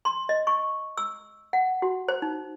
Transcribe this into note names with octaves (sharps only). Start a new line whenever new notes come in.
C6
D#5
C#6
E6
F#5
F#4
C5
D#4